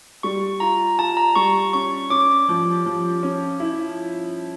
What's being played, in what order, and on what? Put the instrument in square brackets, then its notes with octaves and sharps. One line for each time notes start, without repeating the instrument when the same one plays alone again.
[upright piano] G3 [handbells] C#6
[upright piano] F4 [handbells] A#5
[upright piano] F4 [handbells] A5
[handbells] A#5
[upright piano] G3 [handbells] C#6
[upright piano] C#4 [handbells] C#6
[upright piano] C#4 [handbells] D6
[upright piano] F3
F3
C#4
E4